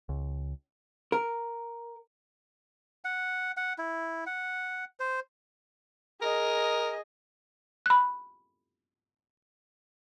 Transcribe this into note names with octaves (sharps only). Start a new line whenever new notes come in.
C#2
A#4
F#5
F#5
E4
F#5
C5
G#4 A#4 D#5
B5 F#6